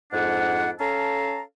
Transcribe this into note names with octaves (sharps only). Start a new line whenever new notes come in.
F2 G#2 D4 F#5
C#4 A4 F5 A5 A#5